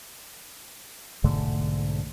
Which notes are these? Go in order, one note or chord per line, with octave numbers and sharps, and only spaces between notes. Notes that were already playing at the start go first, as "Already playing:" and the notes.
B1 G#2 D3 A3